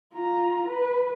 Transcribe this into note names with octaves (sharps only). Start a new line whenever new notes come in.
F4 A#5
B4